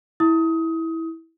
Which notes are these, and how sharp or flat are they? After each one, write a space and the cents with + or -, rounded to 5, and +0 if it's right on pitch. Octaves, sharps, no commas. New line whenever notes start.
E4 -15 D#6 +25